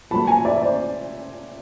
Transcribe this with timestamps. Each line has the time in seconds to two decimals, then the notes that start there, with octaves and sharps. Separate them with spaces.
0.11 A#2 F#3 A3 A5 B5
0.27 G#5 A#5
0.45 D5 E5
0.62 C5 D5